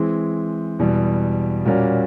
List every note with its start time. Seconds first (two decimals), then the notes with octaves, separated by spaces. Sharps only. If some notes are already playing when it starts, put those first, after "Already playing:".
Already playing: E3 G#3 C4
0.79 E2 B2 G3
1.65 A#2 G3 A#3 C#4 F#4